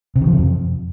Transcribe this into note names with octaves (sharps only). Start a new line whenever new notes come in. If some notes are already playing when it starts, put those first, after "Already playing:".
C3
D#3
F3
C3
F2